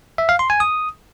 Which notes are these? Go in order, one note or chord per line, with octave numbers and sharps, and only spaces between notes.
E5
F5
C6
G#5
D#6